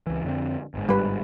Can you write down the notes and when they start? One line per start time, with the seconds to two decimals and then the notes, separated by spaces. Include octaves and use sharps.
0.07 C#2 E3
0.24 F2 D3 C4
0.74 G1 G#2
0.89 G3 B4